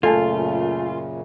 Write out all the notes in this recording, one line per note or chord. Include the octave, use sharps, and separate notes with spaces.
F#2 A#2 C#3 A3 F4 A4 G#5 A5